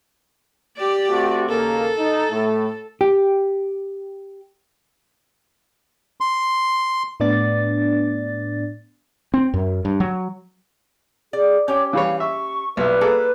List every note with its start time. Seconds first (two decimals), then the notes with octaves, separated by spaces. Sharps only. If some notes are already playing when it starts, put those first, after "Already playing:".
0.77 G4 D5
1.09 A3 C4 F#4
1.49 D#2 C#3 A#3 A4
1.99 D#4
2.31 A2 A3
3.01 G4
6.21 C6
7.20 A2 B3 D4 D5 A6
9.34 C4
9.54 F#2
9.85 G2
10.00 F#3
11.33 G#4 D5
11.68 C#4 G4 C#5 G5
11.93 E3 G3 C#5 F5
12.20 E5 C#6
12.77 B1 G3 B4 E5
13.01 A#3 G#4 A4